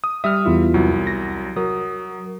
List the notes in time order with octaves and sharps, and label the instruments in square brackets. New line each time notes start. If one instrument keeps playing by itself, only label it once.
[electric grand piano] D#6
[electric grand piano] G3 E5 [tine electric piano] D#6 F6
[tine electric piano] E2 E4 F4
[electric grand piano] C2 F#3
[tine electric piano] A#6
[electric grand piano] F#3 [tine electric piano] A#4 D#6